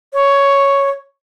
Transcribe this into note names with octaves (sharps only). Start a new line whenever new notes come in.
C#5